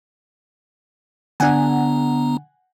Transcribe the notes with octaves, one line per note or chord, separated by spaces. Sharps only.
D3 B3 D4 F#5 G#5 A#5